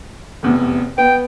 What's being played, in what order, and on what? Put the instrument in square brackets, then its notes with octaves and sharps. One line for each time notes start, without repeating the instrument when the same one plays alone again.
[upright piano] F1 E2 C3
[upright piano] B3 [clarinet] G5